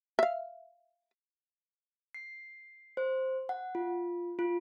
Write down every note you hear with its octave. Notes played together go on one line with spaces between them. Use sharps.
E5 F5
C7
C5
F#5
F4
F4